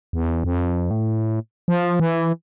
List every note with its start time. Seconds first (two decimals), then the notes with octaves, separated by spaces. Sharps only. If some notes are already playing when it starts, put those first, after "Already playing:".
0.13 E2
0.44 F2
0.91 A2
1.68 F3
2.00 E3